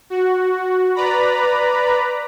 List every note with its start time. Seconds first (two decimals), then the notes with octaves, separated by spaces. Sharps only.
0.10 F#4
0.95 B4 D5 A#5 B5